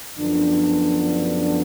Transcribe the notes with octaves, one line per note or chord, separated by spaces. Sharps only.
F#2 D3 F3 B3 D4